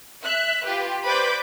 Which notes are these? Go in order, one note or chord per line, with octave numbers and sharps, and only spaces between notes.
E5 F#6
F4 G4 B4
B4 C5 D5 B5 D6 G6